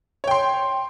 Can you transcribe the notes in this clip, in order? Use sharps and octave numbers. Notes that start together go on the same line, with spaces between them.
C#5 G5 C6